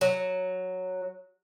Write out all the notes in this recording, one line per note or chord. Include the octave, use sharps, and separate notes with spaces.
F#3